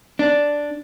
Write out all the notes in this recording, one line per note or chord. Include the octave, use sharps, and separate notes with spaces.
D4